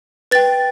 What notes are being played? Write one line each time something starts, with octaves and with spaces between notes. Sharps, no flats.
B4 G5 A6